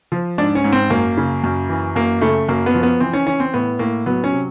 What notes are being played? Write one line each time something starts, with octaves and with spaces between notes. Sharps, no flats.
F3
G#2 D4
C#4
G#2
C4
F#2 A#3
C#3
F#2
E3
F#2 A#3
C#3 A3
F#2 A#3
B3
F3
B3
E3 C4
C#4
E3 C#4
C4
A2 B3
A2 A#3
F#3 B3
C#4
C3